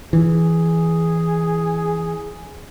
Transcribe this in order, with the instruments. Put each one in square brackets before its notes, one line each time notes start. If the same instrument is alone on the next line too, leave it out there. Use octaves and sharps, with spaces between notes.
[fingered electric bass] E3 [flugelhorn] G#4